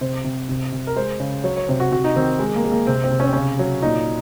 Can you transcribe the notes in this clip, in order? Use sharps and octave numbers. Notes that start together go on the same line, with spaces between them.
C3 C5
C3
C3
C3
A#4
G#3 C5
C#3
F#3 C#5
C#5
C3 C5
F#4
C3 F#4
D#4
D#3 C4
G#3
A#3
G#3
A#3
C3 C4
C4
C3
C#4
C4
C#3 C#4
F#3
A#2 D#4